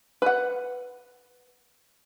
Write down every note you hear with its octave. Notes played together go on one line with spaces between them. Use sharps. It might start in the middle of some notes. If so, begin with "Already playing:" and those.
B4 F#5